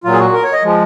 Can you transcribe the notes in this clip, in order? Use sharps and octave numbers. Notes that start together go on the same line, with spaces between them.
A#2 F#3 F4
G#4
F#4
A#4
C#5
D#5
F3 G#3